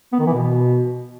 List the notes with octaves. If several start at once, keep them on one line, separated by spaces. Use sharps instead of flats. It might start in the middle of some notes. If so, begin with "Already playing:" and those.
B3
D#3
E3
B2